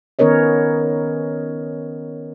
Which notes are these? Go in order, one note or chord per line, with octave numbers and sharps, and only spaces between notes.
D#3 B3 C#4 A#4 C#5 D#5